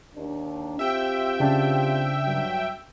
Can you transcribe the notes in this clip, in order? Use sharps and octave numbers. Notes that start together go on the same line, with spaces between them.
D#2 D4
C4 F4 G4 E5 G5
C#3 D4
G2 F#3